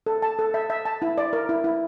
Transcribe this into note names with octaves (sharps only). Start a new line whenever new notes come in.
A4
A5
A4
E5
E5
A5
E4
D5
A#4
E4
E4